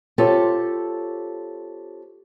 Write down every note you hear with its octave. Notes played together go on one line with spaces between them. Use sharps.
C4 F4 G4 A4 C#5